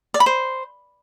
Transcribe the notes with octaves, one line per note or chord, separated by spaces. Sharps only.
D5
B5
C5